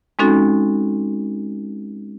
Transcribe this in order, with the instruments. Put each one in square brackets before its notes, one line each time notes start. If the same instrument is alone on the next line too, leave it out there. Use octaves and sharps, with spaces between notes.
[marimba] G#3 C4 C#4 D#4 F#4 A4